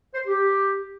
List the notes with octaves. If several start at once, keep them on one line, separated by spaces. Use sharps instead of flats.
C5
G4